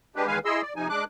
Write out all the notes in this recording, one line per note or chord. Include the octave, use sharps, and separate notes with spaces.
G#3 D4 G4 B4
E2 D#3 G#3 B4 F5 G#5
E4 G#4 D#5 C6 E6
D5
C3 F3 D#4 G#5
G#3 D4 D6 F#6